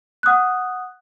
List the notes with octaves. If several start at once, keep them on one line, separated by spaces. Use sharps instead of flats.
F#5 D#6 F6 F#6